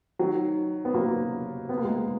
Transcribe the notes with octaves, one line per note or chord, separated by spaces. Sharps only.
D#3 F#3
B3
F#3 A#3
B3
A#3
G#3 B3